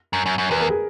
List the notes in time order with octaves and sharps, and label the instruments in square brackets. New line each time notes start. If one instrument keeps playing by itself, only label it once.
[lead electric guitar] F#2
F#2
F#2
[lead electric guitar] E2 [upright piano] B4
[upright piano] A#4
G#4